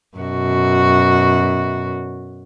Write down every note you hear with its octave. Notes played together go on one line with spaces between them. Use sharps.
F#2 B2 F#4